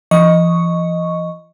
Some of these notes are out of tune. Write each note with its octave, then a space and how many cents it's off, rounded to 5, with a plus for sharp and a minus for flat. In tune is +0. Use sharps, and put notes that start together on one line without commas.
F3 -45 D#5 +0 C#6 +0